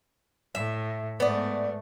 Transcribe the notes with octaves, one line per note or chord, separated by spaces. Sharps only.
A2 E5
G#2 A3 B3 D5